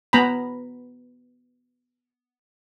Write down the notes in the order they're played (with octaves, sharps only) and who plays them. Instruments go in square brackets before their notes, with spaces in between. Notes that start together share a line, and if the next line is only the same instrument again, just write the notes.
[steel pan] B3 A#5 B5